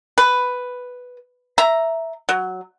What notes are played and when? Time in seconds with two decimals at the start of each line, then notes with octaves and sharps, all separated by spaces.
0.18 B4
1.58 E5 A#5
2.29 F#3